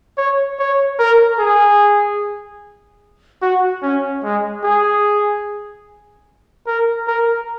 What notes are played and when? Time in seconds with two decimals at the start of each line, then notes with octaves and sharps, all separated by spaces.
0.18 C#5
0.59 C#5
0.99 A#4
1.39 G#4
3.42 F#4
3.82 C#4
4.24 G#3
4.64 G#4
6.67 A#4
7.08 A#4